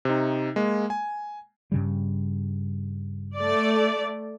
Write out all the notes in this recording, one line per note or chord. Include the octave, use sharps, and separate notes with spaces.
C3 D#4
G#3 A#3
G#5
G2 C#3 G3
A3 D5